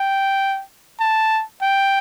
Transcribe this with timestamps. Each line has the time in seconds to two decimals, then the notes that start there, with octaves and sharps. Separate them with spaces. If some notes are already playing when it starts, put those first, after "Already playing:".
Already playing: G5
1.00 A5
1.62 G5